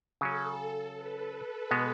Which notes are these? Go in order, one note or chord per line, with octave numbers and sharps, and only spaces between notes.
C#3 F#3 C#4 A4
B4
B2 G#3 B3